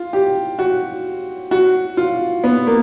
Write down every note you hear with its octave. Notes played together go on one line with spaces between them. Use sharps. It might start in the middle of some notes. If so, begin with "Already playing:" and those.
Already playing: F4
G4
F#4
F#4
F4
B3
A#3